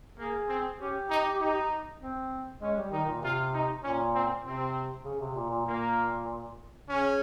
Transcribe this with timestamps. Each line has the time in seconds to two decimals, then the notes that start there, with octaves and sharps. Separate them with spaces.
0.18 A#3 G#4
0.48 C4
0.79 C#4 G4
1.09 D#4
1.39 D#4
2.00 C4
2.61 G#3 C#4
2.77 G3
2.91 D#3 D#4
3.06 A#2
3.22 C3 F4
3.53 D#4
3.82 A#2 C#4
4.13 C4
4.44 C3 C4
5.05 C#3
5.20 C3
5.35 A#2
5.50 A#2
5.65 A#2 A#3
6.88 C#3 C#4